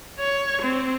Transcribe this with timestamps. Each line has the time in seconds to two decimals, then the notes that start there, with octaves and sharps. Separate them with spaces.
0.20 C#5
0.62 C4